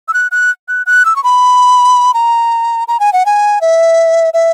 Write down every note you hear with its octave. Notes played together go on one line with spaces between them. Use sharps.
E6
F#6
F#6
F#6
F#6
E6
C#6
B5
A#5
A#5
G#5
F#5
G#5
E5
E5